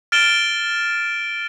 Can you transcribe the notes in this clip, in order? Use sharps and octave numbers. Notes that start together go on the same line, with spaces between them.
F6 A6 D7 E7 G7